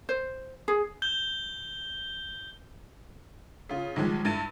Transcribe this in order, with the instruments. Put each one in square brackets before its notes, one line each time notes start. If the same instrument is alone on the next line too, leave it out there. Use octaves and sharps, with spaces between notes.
[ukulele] C5
G#4
[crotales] G6 G7
[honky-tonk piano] C#3 F4
B1 D#3 F3 G3 G#3
G2 E4 A6 D#7